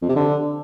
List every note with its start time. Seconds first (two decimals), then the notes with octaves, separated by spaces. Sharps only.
0.02 F2
0.09 C3
0.16 D3